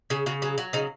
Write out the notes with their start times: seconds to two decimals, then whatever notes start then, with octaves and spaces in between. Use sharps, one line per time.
0.10 C#3 G#4
0.26 C#3 F#4
0.42 F#3 G#4
0.58 F#3 F#4
0.73 C#3 D#4